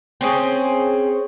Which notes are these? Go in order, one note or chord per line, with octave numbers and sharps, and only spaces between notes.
C4 C#4 G#4